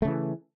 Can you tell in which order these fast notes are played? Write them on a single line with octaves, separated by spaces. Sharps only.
A3 C#3 E3